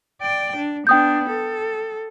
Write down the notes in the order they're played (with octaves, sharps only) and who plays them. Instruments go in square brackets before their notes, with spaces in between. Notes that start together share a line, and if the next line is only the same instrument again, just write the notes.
[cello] D5 G5
D4
[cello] B3 D4 [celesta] G5 D#6 G6
[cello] A4